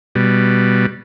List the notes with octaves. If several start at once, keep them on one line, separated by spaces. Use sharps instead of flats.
B2 G3